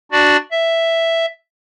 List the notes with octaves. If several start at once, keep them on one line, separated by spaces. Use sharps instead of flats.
D4 F#4 D5
E5